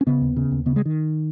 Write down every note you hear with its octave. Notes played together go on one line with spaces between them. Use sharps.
C#4
C#3 B3
D#2
C#3
D#2
C#3 B3
G#3
D#3